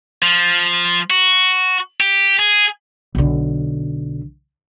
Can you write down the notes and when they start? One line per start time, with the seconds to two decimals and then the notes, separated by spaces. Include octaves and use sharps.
0.22 F3
1.10 F#4
2.00 G4
2.39 G#4
3.15 B1 D3